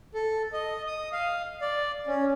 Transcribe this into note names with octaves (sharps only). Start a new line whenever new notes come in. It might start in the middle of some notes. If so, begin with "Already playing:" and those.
A4
D#5
D#6
F5
D5
C#4